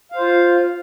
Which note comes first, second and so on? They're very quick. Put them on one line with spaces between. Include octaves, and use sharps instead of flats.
F5 C5 F4